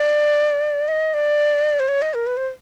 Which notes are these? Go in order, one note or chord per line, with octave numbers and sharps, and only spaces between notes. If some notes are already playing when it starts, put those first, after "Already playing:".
Already playing: D5
D#5
D5
C5
C#5
D#5
A#4
B4
C5